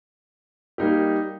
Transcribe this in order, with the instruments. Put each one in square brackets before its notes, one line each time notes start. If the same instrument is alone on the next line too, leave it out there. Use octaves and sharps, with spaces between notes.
[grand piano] G3 A#3 D#4 G4